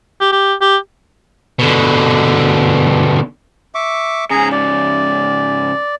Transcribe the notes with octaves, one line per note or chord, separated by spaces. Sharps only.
G4
G4
G4
B2 D3
E5 C#6 D6
G#2 C#3 G#4 A#5
D5